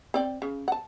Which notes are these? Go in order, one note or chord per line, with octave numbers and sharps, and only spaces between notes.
C4 D5 G5
C#3
F#5 A5